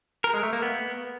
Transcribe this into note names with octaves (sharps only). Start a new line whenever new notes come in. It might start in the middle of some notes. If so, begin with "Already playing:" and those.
A#4
G#3
A3
A#3
B3